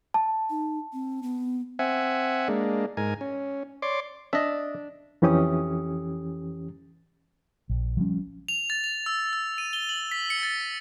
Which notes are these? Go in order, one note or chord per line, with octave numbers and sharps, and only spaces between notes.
A5
D#4
C4
B3
C4 E5 F#5 G#5
G#3 A#3 D4
G#2 A#4 G#5
C#4
C#5 D5 C6 D6
D4 D#5 E5
F2 E3 C#4 G4 D#6
A#1
F3 G3 C#4
F7
A6
F7
E6
E6
D#7
G7
F#7
B6
C#7
A6